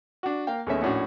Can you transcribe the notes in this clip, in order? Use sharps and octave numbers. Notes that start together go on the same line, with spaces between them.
D4 F#4
A#3 F5 G5
D#2 G#3 A3 B3 C#4 E5
A#1 A2 C#4 D4 F#4